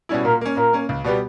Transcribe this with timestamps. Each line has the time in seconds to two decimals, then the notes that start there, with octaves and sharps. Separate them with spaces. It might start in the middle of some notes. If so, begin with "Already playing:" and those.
0.09 B2 G3 C#4 E4
0.25 A#2 A#4
0.41 A#3 C#4
0.57 A#2 A#4
0.73 A#3 C#4
0.89 C#2
1.04 B2 G3 B3 G4